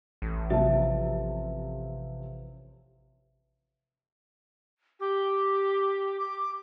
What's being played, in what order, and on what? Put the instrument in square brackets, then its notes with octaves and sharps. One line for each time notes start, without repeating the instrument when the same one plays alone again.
[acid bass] A1
[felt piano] C3 F3 [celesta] E5 A5
[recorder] G4
[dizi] D6